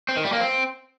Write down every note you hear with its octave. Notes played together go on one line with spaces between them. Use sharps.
C4
D#3
G3
A#3
C4